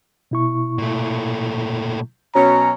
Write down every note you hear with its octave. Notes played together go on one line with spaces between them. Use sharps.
B2 E4 C#6
A#2 A3
B2 F#3 C#4 A#5